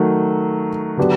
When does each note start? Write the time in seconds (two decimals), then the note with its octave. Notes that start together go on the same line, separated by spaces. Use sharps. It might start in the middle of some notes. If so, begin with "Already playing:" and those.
Already playing: D#3 F#3 A3
0.97 D3 F#3 B3 D4 G4